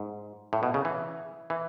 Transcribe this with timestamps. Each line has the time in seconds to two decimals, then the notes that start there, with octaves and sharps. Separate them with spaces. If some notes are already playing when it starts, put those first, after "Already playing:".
Already playing: G#2
0.53 A2
0.63 B2
0.74 C#3
0.85 E3
1.50 E3